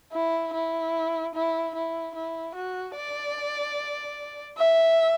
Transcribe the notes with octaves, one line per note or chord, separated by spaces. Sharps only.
E4
E4
E4
E4
E4
F#4
D5
E5